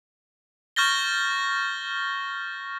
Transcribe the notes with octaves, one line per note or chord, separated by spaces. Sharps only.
C#6 F6 G6 A6 A#6 G7